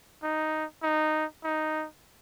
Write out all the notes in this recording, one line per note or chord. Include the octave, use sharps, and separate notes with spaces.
D#4
D#4
D#4